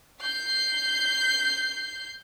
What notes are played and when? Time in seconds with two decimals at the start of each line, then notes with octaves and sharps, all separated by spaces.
0.22 G6 C7